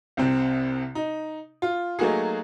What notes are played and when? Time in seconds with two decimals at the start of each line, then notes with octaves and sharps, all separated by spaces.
0.17 C2 C3 C4
0.95 D#4
1.62 F4
1.99 F#3 A3 A#3 D#4 F#4 G#4